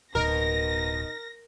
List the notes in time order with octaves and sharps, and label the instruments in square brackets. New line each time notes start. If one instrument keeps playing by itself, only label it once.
[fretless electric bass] D1 [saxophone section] B2 D#4 [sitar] A#4 [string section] A#6